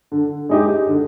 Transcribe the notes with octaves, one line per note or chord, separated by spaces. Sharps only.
D3
G#3 D#4 G4
D3